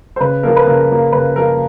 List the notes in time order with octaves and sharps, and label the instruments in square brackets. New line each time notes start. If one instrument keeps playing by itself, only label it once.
[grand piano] C5
C#3 B4
F3 A#3 A#4
B4
C#3 A#4
F3 A#3
C#3 B4
F3 A#3 A#4